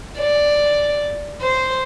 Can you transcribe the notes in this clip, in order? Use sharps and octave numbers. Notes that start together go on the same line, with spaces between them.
D5
C5